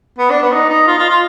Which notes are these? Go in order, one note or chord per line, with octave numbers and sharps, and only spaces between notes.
B3
D4
B3
D#4
D#4
F4
F4
F4